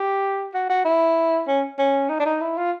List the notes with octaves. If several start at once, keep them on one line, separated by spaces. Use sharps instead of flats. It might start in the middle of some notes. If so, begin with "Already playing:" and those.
Already playing: G4
F#4
F#4
E4
C#4
C#4
D#4
D4
D#4
E4
F4